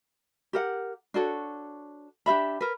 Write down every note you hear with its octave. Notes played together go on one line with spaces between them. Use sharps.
G4 A#4 F#5
D4 F#4 A4 C#5
D4 G4 E5 B5
A#4 B4